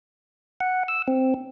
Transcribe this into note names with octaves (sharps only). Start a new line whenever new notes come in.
F#5
E6
C4